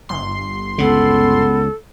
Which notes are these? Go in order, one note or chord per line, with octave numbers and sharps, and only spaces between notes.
G1 C6
C#2 C#3 B3 A4